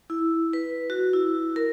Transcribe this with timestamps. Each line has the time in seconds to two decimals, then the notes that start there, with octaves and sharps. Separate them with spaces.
0.10 E4
0.53 B4
0.90 F#4
1.13 E4
1.56 A#4